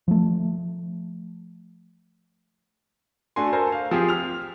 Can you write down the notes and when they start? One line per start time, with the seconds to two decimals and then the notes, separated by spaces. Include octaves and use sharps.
0.08 F3 A3
3.36 A3 D4 F#4 G#5 C6
3.53 A4 A#4 C5 G#5
3.72 F5
3.91 F3 C4 G4 G#4
4.08 F6 F7